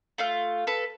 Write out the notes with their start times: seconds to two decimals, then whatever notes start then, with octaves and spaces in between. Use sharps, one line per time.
0.18 A3 F4 F5
0.67 A4 B4